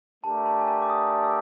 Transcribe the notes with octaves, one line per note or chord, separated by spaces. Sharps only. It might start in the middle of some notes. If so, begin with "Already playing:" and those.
A3 D4 G4 A#4 D5 A5
A5
G#5
A5
D6
D#6
E6